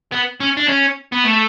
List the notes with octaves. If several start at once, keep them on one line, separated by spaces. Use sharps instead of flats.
B3
C#4
D4
C#4
B3
A3